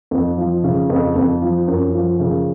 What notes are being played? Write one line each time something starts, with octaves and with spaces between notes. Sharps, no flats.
F2
F3
C#3
F2
F2
F3
F#2
F3
C#3